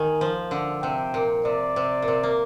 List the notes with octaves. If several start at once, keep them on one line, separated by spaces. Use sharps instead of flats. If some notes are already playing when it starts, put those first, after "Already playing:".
Already playing: D#3 A#3 G#5
F3
D3
C3 G5
A#2
C3 D5
C3
A#2
C3
A#3